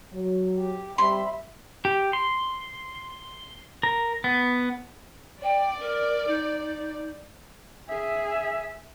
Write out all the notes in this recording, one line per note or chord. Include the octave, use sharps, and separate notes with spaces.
F#3
G4
G3 C4 C5 E5 B5 C6
G4
C6
A#4
B3
D5 G5
A#4
D#4
G#4 E5